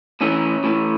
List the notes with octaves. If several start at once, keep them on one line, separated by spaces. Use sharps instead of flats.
A2 E3 C#4
A2 E3